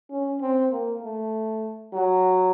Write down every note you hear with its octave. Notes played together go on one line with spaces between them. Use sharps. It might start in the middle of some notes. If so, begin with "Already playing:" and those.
C#4
C4
A#3
A3
F#3